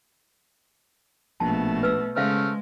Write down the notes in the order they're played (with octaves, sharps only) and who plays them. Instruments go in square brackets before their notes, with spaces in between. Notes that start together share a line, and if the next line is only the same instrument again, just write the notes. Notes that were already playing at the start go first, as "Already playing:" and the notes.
[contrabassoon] A#1 [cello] B2 A3 [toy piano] A5
[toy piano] B4 E6
[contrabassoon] C#3 [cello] G#3 [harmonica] A3 F6 [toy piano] C5 E5 F5